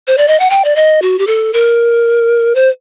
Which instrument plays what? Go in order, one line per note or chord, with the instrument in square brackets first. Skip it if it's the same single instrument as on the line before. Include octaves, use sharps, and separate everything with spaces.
[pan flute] C5
D5
D#5
F#5
G5
D5
D#5
F#4
G4
A4
A#4
C5